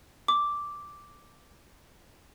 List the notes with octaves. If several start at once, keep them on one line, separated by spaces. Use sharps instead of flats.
D6